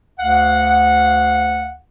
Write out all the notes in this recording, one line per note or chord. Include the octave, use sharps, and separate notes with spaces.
D2 F5 F#5